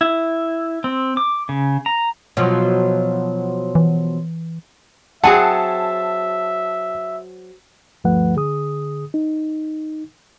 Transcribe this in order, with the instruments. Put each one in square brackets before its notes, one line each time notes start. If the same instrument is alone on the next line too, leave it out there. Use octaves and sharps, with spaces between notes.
[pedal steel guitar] E4
C4
D6
C#3
A#5
[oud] B2 F3 F#3
[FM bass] E3
[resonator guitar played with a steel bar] F#3 C4 G#4 [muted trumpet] E5 [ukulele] F#5 G#5 [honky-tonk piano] A5
[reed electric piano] D2 G2 F3 A3 B4 F#5
D3 G#4 D#6
D#4